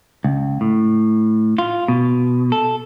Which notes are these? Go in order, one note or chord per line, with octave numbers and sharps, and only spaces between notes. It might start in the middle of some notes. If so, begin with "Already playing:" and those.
C#2
A2
F4
B2
A4